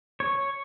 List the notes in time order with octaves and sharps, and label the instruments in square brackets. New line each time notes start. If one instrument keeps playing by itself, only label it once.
[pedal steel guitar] C#5